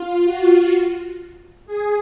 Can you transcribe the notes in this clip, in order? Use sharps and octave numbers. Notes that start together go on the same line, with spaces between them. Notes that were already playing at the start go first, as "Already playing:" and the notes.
Already playing: F4
F#4
G#4